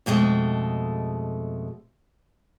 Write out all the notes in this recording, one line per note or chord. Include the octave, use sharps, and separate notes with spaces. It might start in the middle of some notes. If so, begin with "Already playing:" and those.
F2 B2 G#3 A3